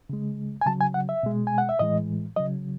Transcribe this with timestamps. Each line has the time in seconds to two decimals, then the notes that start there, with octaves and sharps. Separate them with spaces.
0.10 C#3 G#3
0.61 G#5
0.66 C#3 F#3 A5
0.81 G#5
0.94 F#5
1.09 E5
1.23 B2 G#3
1.47 G#5
1.58 F#5
1.69 E5
1.79 A2 E3 G#3 D#5
2.36 C#3 F#3 D#5